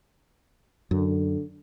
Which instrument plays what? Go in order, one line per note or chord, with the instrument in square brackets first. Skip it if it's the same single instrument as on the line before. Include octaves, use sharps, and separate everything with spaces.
[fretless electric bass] F#2 [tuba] D3